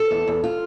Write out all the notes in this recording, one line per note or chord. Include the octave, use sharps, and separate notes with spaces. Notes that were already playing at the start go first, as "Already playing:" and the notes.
Already playing: A4
E2
E2
F4